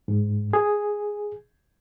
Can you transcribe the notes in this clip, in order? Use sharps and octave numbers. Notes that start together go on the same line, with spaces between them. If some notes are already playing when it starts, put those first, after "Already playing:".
G#2
G#4